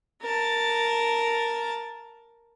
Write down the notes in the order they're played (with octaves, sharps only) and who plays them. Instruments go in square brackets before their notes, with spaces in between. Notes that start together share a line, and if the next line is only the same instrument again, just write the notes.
[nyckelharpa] A#4 A5